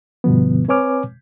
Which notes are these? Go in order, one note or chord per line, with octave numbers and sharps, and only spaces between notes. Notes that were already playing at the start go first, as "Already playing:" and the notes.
G2 B2 D3 F3 B3
C4 B4 C#5 G#5 D6 F6